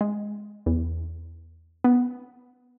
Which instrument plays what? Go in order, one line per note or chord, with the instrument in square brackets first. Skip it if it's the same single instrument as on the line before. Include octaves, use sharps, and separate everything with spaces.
[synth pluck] G#3
E2
B3